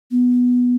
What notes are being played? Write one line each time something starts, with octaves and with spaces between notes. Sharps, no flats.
B3